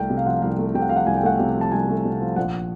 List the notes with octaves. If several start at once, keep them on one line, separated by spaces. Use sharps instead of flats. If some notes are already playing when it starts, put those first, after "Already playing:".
Already playing: C2 A3 G5
C3
F5
F3 F#5
C2 F5
A3
C3 G5
F#5
F3 F5
F#5
C2 G#5
G5
A3 F#5
C3 G5
F3
A5
C2 G#5
A3
C3
F3
A#1 F#5